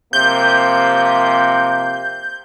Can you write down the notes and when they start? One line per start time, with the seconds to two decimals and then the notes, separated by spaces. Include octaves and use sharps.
0.13 C3 F3 A#3 G6